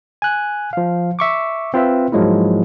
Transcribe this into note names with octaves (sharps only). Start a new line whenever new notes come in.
G#5 F#6
F3 F5
E5 C#6 D6
C4 F4 B4 E5
G#2 F3 F#3 G#3 A#3 E4